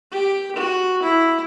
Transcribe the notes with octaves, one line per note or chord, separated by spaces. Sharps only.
G4
F#4
E4